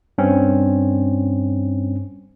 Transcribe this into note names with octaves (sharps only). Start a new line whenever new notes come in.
G2 C4 C#4